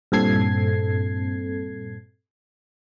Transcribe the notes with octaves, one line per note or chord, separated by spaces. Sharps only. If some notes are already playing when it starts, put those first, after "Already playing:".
G2 A#2 C4 A4 G#6 C7